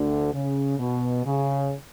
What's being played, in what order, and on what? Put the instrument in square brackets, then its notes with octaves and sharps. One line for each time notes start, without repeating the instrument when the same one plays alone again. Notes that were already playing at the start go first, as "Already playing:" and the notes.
Already playing: [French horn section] D2 D3
C#3
B2
C#3